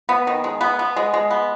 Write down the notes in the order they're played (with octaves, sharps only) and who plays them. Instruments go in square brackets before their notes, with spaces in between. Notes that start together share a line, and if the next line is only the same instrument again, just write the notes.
[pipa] B3
D#3
G#3
B3
B3
G#3
G#3
B3